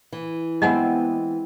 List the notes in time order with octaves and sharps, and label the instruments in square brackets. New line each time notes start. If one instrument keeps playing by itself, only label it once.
[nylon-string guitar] E3
[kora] G#3 C4 E4 [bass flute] B3 [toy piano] D#5 F#5 G#5